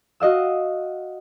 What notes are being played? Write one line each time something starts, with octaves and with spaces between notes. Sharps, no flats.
F#4 D#5 F5 E6